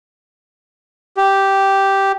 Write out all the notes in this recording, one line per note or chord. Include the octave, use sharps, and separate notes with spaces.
G4